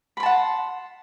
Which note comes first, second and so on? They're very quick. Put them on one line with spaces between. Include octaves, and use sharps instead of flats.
B5 C6 A5 F#5